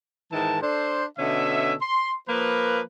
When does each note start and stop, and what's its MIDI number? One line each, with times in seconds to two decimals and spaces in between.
0.31 0.58 44
0.31 0.58 51
0.31 0.58 52
0.31 0.58 70
0.31 0.58 81
0.61 1.05 62
0.61 1.05 69
0.61 1.05 72
1.18 1.74 47
1.18 1.74 50
1.18 1.74 61
1.18 1.74 69
1.18 1.74 76
1.81 2.14 84
2.28 2.80 53
2.28 2.80 58
2.28 2.80 70
2.28 2.80 71